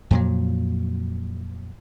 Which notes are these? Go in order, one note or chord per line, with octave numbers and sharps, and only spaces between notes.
F2 A#2 F#3